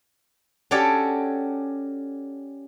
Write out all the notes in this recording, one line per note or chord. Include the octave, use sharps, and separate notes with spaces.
C#4 F#4 G4 A4 C#5 D5